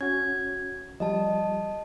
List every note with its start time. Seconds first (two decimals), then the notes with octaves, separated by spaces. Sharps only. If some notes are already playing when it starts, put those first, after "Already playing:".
0.01 C#4 F#4 G#6
1.00 F3 G3 D#5 A5